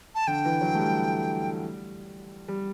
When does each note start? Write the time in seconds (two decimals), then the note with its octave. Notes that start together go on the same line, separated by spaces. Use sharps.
0.15 A5
0.27 D3 G5
0.45 E3
0.61 F#3
0.75 A3
0.79 G3
2.48 G3